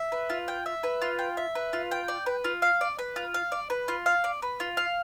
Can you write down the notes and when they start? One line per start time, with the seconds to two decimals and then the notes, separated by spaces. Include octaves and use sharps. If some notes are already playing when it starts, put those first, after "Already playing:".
Already playing: E5
0.12 B4
0.30 F4
0.48 G5
0.66 E5
0.83 B4
1.02 F4
1.19 G5
1.37 E5
1.55 B4
1.73 F4
1.91 G5
2.08 D5
2.26 B4
2.44 F4
2.62 F5
2.81 D5
2.99 B4
3.16 F4
3.34 F5
3.52 D5
3.70 B4
3.88 F4
4.06 F5
4.24 D5
4.42 B4
4.60 F4
4.77 F5